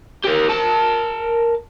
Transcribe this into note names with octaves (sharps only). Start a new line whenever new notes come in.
G4 A#4
A#4 A5